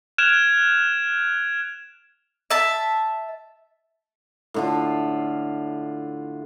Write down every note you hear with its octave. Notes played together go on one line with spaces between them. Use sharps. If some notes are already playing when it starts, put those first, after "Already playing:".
F6 F#6 G#6 D7 E7 F7
E5 A5
A2 D3 F4